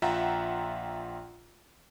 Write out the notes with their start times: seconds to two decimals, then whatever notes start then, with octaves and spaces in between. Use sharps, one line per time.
0.02 A#1 F4 E5 F#5 G5 A#5